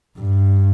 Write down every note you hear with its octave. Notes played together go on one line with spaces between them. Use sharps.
G2